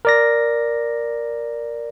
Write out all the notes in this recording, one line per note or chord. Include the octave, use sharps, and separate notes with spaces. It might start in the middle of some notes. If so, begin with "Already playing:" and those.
A#4 D5 A#6